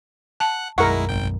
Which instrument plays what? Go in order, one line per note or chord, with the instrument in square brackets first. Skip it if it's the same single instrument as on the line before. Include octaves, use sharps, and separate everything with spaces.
[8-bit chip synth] F#5 F#6 [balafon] A5
[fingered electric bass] B1 F#2 [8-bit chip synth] G#3 E4 [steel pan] A#4 F#5 [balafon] C#6
[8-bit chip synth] G#1 G5